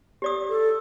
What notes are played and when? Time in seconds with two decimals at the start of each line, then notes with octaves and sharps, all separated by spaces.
0.22 G4 D5 D#6
0.49 A4